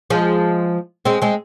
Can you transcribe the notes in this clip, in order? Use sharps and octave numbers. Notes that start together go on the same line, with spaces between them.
F3 G#3
G#3 C4
G#3 C4